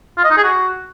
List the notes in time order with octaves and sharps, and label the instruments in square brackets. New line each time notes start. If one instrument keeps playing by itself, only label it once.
[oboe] F4
D#5
D#4
G#4
F#4